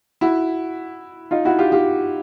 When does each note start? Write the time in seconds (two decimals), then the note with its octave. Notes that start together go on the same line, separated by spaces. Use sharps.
0.21 E4 F#4
1.31 D#4 F4
1.45 E4 F#4
1.59 F4 G4
1.72 F4 G4